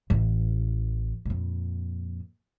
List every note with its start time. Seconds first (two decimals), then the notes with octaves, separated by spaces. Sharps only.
0.10 A1 E3
1.25 F2 A#2